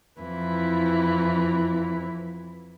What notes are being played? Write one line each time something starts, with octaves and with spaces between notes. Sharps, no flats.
F2 E3 E4